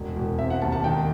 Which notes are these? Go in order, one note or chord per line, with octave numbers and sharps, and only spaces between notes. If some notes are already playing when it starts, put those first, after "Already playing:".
Already playing: E1
E1
C4 E5
F#5
D#2 A5
A5
D#3 G5